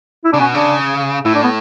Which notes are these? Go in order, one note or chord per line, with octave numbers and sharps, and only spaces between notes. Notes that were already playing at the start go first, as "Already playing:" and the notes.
E4
C#3 D4
B2 C#4
C#3 D4
A2 E4
D4
B3